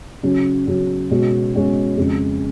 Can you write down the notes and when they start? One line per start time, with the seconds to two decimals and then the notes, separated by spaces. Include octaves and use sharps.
0.23 C#3 F#3 C#4
0.67 C#3 F#3 C#4
1.11 B2 G#3 C#4 F#4
1.54 B2 G#3 C#4 F#4
1.97 F2 C#3 G#3